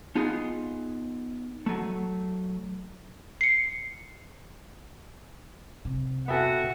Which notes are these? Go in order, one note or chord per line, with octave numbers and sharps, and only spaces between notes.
B3 D#4 F4 G#4
F#3 A3
C7 C#7
C3
B3 F#4 A4 B4 E5 G5 G#5